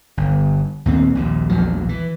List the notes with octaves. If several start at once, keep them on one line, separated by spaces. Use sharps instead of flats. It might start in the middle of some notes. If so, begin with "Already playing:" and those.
G1
D#2 A#2 C4
A#1 D#2 A#2
A#1 E2 F3 F#3
E3